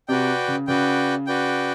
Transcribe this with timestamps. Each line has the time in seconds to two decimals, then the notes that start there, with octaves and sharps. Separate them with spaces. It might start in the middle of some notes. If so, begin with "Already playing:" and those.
0.08 C3 F#4 B4 D5 G5
0.48 C#3
0.67 C#3 F#4 B4 D5 G5
1.27 F#4 B4 D5 G5